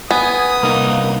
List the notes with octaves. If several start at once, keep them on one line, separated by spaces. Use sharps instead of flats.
B3 G#5 D#6
C2 A#3 D#4